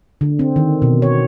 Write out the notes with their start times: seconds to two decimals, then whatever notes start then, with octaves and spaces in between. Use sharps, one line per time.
0.21 D3
0.39 C4
0.56 D#3
0.82 B2
1.02 C#5